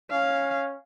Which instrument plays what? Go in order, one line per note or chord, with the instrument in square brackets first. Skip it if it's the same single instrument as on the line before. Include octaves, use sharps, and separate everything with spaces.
[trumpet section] C#4 [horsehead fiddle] F5